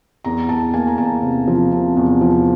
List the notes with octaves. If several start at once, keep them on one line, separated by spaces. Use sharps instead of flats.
E2 A#5
E2 A5
A#3 G#5
A#5
E2 A5
C3
F3
C3
E2
F3